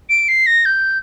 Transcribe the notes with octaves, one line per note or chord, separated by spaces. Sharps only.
D7
C7
A#6
G6